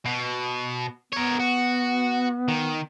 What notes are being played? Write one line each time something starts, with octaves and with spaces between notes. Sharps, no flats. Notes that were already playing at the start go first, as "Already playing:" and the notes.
B2
B3 A#4 C#5
F#4
D#3